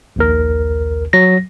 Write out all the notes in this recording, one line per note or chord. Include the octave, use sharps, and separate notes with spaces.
A#1 D#2 A#4
F#3 A#6